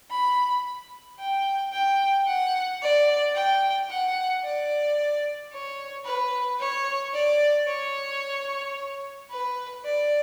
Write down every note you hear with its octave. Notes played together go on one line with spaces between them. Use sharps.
B5
G5
G5
F#5
D5
G5
F#5
D5
C#5
B4
C#5
D5
C#5
B4
D5